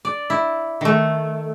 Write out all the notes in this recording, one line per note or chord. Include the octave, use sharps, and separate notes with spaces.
D5
E4
D#3 A3